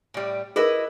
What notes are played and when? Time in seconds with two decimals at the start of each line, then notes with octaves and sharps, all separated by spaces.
0.14 A2 G3
0.56 E4 G#4 A#4 B4 D#5